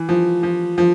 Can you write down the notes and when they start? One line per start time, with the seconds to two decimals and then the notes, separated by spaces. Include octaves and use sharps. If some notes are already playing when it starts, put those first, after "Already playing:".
Already playing: E3
0.09 F3
0.43 F3
0.78 F3